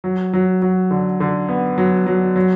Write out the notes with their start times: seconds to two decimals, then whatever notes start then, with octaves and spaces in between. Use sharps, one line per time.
0.04 F#3
0.33 F#3
0.62 F#3
0.91 D3
1.20 D3
1.49 B3
1.78 F#3
2.07 F#3
2.36 F#3